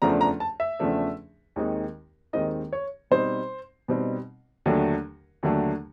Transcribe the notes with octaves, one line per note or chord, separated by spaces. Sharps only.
E2 C#3 F3 A3 D4 A#5
A#5
A5
E5
E2 C#3 F3 A3 D4
D#2 D#3 G#3 C4 D#4
D#2 D#3 G#3 C4 D#4 D#5
C#5
B2 G3 C4 D#4 C5
B2 G3 C4 D#4
D#2 D3 F#3 A3 D4
D#2 D3 F#3 A3 D4